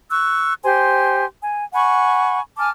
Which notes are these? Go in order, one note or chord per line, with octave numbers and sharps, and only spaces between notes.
C#6 E6 F#6
G4 C5 G#5 C6
G#5
F#5 G#5 B5 C#6
G#5 A5 D6 F6